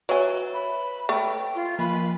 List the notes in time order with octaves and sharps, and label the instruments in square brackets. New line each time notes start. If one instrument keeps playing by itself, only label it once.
[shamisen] F#3 G#5 [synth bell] B4 C#5 E5
[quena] B5
[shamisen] A3 [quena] G5
[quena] F4
[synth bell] F3 A#3 [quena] B5